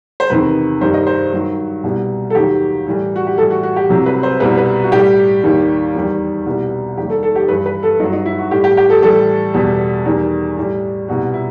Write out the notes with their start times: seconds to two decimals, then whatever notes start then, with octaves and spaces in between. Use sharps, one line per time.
0.20 C5
0.30 E2 C3 D#3 B4
0.81 G2 D#3 G3 C5
0.94 D#5
1.07 C5
1.32 G2 D#3 F#3
1.83 C2 B2 G3
2.30 A4
2.35 D#2 D#3 F#3 G4
2.86 A2 E3 G3
3.16 F#4
3.27 G4
3.38 A2 E3 G3 A4
3.51 F#4
3.63 F#4
3.76 G4
3.89 C2 C3 F#3
4.06 B4
4.23 C5
4.40 C2 B2 G3 B4
4.57 B4
4.84 F#4
4.92 A2 G3 G4
5.43 D#2 D#3 G3
5.95 E2 D#3 G3
6.46 C2 B2 G3
6.97 D#2 D#3 G3 G4
7.10 A4
7.23 A4
7.35 G4
7.48 G2 E3 G3 B4
7.66 B4
7.83 A4
8.00 G2 D#4
8.03 F#3
8.13 D#4
8.26 E4
8.39 F#4
8.51 A2 G3 G4
8.64 G4
8.77 G4
8.90 A4
9.02 A2 E3 G3 A4
9.54 E2 B2 G3
10.05 E2 D#3 G3
10.57 A2 G3
11.08 C2 B2 G3 F#4
11.34 E4